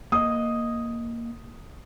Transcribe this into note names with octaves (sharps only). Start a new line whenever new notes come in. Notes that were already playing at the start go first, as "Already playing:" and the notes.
A#3 D#5 D#6